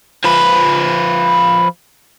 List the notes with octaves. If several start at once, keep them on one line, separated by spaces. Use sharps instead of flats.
F3 B4